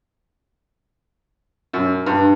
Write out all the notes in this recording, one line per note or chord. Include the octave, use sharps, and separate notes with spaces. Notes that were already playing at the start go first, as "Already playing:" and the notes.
F#2
G2